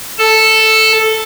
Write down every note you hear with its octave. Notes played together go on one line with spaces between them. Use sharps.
A4 A5